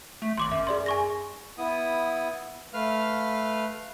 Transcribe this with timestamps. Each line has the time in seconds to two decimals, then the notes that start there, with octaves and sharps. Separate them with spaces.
0.22 A3
0.38 G#1 C6 D6 F#7
0.51 F#2 E5
0.67 G#4 D5 C6
0.86 G#5 C#6 A#6
1.58 B3 E4 D#6
2.74 A3 B4 F5 F6